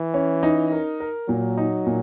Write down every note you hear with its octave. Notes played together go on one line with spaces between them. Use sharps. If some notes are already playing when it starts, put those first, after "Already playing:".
Already playing: E3
C#4
D#4
A#4
A#4
A#2 F#3
D#4
A#2